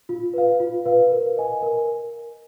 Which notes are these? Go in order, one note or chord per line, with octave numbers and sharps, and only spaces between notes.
F4
B4 F5
F4
B4 F5
A#4
D#5 G#5
A#4